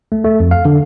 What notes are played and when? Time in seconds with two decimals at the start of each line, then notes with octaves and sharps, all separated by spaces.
0.12 A3
0.25 A3
0.40 F2
0.51 F5
0.65 D3